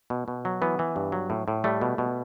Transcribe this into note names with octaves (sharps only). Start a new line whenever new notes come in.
B2
B2
F#3
E3 B3
E3
G2
F#3
A2
A2
G3 A3
B2
B2